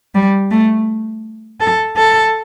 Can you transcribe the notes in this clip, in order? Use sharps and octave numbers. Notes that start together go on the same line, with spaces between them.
G3
A3
A4
A4